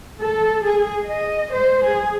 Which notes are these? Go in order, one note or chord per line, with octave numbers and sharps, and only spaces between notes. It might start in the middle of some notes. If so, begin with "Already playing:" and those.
A4
G#4
D#5
C5
G#4